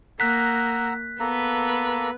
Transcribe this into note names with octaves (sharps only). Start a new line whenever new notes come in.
A#3 F#5 A#5 E6 F#6 B6
A#3 B3 A4 B4 A#5